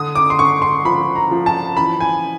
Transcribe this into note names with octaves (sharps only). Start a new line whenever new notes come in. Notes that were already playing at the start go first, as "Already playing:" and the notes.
Already playing: D3 D#6
D6
C6
D3 C#6
C6
F3 B5
A#5
F3
A5
E3 B5
G#5